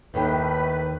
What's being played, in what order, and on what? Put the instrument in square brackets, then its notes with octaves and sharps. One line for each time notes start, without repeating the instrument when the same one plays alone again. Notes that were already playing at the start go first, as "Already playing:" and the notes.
[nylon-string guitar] D#2 D#3 G5 [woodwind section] A2 B4